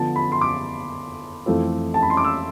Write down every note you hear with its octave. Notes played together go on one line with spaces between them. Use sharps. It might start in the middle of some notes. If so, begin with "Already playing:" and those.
Already playing: D3 F3 B3 A5
B5
C6
D6
F2 E3 A3 C4 F4
A5
B5
C6
D6
E6